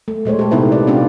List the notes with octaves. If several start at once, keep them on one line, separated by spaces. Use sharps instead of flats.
A3
A#2 G#3 C5 C#5
G4 A4
C3 B3 D#4 E4 B4
D5
B3 C4 D4 F4 G4